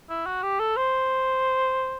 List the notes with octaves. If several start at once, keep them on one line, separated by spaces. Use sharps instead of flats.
E4
F#4
G4
A4
C5